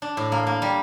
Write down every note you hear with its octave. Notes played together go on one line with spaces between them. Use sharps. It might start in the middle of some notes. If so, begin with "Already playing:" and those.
D4
A2
A#3
A#3
G3